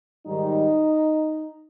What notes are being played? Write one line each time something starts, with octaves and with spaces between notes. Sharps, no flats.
G#2 D#3 G3 D#4